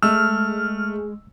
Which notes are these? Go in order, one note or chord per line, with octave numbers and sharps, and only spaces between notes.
G#3 A3 E6 F6